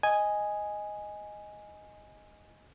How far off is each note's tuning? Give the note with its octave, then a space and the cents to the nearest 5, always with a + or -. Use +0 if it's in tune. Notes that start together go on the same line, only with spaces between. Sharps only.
D#5 +0 G#5 +0